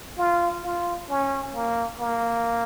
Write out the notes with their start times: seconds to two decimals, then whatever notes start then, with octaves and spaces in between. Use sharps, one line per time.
0.18 F4
0.63 F4
1.10 C#4
1.54 A#3
2.00 A#3